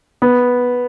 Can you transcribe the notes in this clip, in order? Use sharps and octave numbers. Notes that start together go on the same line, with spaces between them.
B3